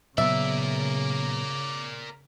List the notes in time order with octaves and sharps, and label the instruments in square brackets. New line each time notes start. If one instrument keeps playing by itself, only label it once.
[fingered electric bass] A#2 F#3 B3 [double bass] C#3 [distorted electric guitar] A#4 D5 [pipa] E5